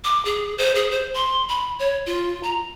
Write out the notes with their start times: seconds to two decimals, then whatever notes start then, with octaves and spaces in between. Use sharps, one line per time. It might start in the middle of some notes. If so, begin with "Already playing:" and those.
0.04 D6
0.25 G#4
0.58 C5
0.75 G#4
0.91 C5
1.14 C6
1.49 B5
1.79 C#5
2.06 F4
2.43 A#5